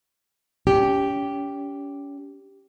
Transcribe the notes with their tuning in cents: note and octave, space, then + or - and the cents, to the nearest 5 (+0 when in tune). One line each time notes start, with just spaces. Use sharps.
C#4 +35 G4 +0